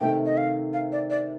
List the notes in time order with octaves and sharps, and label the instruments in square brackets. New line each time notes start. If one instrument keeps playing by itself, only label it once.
[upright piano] C3 D#3 A3 [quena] G5
[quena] D#5
F5
F5
D5
D5